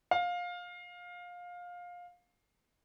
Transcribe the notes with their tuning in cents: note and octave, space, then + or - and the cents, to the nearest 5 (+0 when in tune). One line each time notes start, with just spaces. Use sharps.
F5 +20